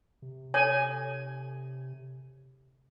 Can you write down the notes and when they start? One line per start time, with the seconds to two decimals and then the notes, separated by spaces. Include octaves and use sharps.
0.22 C3
0.54 D#4 A4 C#5 G#5